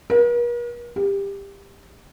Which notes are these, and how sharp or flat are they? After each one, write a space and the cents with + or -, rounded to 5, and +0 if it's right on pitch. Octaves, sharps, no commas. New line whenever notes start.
A#4 +45
G4 +20